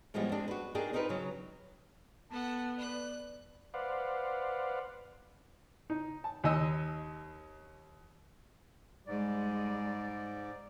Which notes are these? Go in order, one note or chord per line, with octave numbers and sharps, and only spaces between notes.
A2 E3 F3 G3 G#3 B3
G#3 C4 D4
F#4 B4
A#3 D4 D#4 G#4 G5
C4 D#4 F4 A#4 B4
C#3 F#3
B3 A4 F#5 A5
B4 D5 F#6
B4 C5 D5 F5 F#5
D#4
A5
D#2 D#4 D#5 E6
G#2 G3 G#3 D5